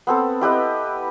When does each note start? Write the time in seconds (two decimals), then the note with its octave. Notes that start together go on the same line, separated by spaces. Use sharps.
0.07 B3 C4 A4
0.41 E4 G4 B4 D#5